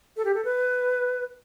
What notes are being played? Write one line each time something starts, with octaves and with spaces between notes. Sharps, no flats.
A4
G4
A4
B4